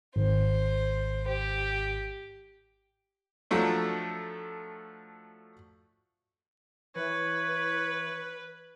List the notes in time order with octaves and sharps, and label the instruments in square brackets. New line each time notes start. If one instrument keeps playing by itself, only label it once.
[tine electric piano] G#1 [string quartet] C5
[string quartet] G4
[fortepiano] F3 F#3 A3 D4
[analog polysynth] E3 [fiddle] B4 [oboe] C#5